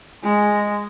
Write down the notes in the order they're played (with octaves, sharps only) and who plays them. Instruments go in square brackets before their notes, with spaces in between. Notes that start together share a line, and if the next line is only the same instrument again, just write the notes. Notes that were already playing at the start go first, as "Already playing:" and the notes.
[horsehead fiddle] G#3